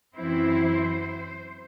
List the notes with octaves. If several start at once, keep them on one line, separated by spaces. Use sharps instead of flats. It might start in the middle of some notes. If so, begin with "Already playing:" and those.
F#2 E3 C4 E4 C5